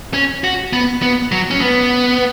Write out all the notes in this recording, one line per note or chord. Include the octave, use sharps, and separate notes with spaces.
C#4
F#4
B3
B3
F#3
C#4
B3